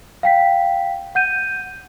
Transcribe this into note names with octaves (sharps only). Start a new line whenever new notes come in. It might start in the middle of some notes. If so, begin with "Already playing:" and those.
F5 G5 B6
F#5 G6 D#7